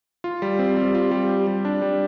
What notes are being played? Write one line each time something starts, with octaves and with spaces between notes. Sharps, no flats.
F4
G3
C4
G3
F4
G3
G4
G3
D4
G3